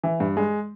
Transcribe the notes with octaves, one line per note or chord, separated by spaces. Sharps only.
E3
G2
G#3